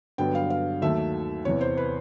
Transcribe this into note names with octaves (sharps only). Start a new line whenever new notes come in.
G2 D3 F#3 B3 G5
F5
F5
D#2 D#3 F#3 A3 E5
E2 C3 E3 C#5
C5
B4